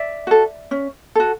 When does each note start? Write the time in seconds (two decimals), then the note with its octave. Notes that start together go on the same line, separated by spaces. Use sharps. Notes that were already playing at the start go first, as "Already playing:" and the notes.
Already playing: D5 E5
0.27 F#4 A4
0.71 C#4
1.16 F#4 A4